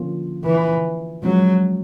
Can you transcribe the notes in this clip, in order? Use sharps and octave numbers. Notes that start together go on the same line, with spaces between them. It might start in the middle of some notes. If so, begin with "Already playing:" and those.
Already playing: D3 F3 A#3 C#4 F4
E3
F3 F#3 G#3 C#4 F#4